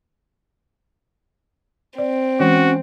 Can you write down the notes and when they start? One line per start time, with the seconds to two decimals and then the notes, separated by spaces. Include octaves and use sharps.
1.98 C4 D5
2.40 E3 G#3 C#4 F#4